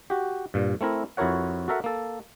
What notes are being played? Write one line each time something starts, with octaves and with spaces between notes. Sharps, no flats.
F#4 G4
G2 A#2
A3 C4 E4 A#4
F2 E4 F#4 A#4 C#5 F#5
F#4 A4 A#4 E5 F#5
A#3 A4